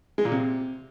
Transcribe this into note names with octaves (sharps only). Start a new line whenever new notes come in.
G#3
A#2
C3